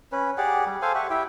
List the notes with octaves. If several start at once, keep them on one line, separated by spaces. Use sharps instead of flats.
C#4 B4
G4 G#4 D5 F#5
G3
A4 C5 F5 G#5
G4 E5 F#5 C#6
E4 G4 E5 G5